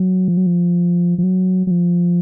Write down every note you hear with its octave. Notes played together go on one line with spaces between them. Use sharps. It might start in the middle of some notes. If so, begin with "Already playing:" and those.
Already playing: F#3
F3
F#3
F3
F3
F#3
F#3
F3